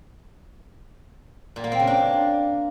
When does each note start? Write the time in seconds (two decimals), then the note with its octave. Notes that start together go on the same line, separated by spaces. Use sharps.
1.56 A#2
1.64 A#3
1.72 C4
1.79 C#3
1.87 D4